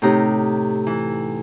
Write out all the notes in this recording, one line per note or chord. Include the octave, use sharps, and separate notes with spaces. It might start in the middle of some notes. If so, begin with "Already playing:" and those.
A2 C3 D#4 G4 A#5
E3